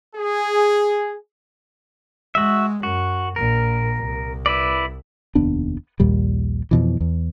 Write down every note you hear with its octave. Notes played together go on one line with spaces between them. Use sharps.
G#4
G#3 F#4 E5
F#2 F#4
A#1 A#2 A#4
C2
E4 B4 D5
F1 D#2 B3 D4
A#1 D#2 A#2 G3
F2 B2 E3
E2